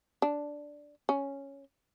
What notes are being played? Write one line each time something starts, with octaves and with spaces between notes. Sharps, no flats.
D4
C#4